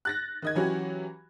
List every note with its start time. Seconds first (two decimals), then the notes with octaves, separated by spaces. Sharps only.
0.05 F#6 A6 A#6
0.42 D#3 D#5 G#6
0.55 E3 F#3 C#4 F#4 G4